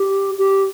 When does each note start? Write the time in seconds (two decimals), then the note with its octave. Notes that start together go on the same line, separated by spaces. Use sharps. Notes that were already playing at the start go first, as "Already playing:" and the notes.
Already playing: G4
0.38 G4